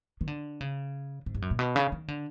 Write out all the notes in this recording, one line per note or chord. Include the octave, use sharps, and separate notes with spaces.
D#3
D3
C#3
G#2
G2
F#2
A#2
B2
C#3
D#3
D3